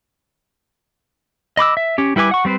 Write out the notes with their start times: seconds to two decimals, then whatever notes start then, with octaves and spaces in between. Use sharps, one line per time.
1.57 D#5 B5 D6 E6
1.77 E5
1.98 C#4 G4
2.16 G3 E4 B4 G#5 D6
2.31 F#5 C#6
2.45 G3 C4 B4 C5